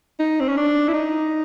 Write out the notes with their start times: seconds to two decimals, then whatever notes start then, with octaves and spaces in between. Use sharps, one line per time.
0.20 D#4
0.41 C4
0.49 C#4
0.57 D4
0.88 E4
0.94 D#4